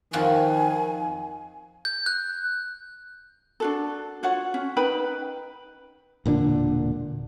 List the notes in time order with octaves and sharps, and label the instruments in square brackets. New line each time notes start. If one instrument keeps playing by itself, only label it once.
[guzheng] F2 F3 F#4 [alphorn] D#3 [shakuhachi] G#5
[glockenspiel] G6
F#6
[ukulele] D4 F#4 A4
F4 F#4 C#5 F#5
C#4
D#4 B4 G5 B5
[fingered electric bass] E1 A#2 D3 D4